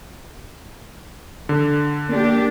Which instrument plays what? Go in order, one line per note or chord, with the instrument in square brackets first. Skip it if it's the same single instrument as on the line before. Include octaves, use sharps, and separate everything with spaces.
[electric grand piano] D3
[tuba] A#3 [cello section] D4 G4